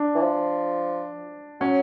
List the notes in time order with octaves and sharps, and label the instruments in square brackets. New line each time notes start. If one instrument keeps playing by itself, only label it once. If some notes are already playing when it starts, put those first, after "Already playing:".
Already playing: [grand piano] D4
[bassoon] E3
F3
[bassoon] F#3 [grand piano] C#4